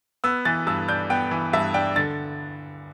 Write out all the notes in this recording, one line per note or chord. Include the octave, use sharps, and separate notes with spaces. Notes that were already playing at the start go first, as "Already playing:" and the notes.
B3 E6
E3 A6
G2 E6
D4 G6
B3 G5
E3
G2 E5
D4 G5
D3 A6